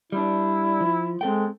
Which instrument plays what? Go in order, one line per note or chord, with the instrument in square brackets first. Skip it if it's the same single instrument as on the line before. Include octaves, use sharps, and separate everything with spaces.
[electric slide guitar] G3 D4 [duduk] E4
[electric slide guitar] F3
[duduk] G#3 [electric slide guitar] C4 A4 G5